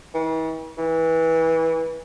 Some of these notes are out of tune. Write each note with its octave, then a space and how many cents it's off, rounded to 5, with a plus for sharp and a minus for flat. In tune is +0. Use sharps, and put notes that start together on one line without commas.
E3 -45
E3 -20